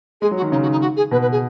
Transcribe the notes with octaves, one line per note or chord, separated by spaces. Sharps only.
G#3 G#4
F#3
F#4
D#3
C#3 D#4
F#4
D#4
F#4
G#4
B2 B4
B4
G#4